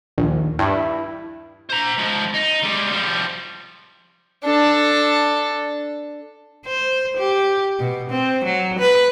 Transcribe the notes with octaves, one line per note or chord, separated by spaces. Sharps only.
A#1 D#2
G2 E4
C5 A#5
G#2 F3
D#4
G3 G#3
F3 G3
D4 A4
C5
G4
B2
C4
F#3
B4